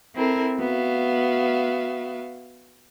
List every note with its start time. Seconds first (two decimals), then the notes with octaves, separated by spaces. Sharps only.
0.15 C4 E4 A4 A#4
0.58 B3 F#4 E5 F5